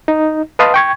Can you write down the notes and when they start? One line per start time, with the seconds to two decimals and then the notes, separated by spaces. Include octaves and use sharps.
0.08 D#4
0.59 B4 D#5 F5 A5 C6 D#6
0.74 G5 C#6 G#6